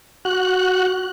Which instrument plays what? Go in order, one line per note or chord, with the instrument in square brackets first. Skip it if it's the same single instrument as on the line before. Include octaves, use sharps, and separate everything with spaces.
[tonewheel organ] F#4 F#6